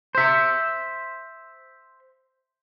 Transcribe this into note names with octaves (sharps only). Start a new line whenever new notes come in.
C5 E5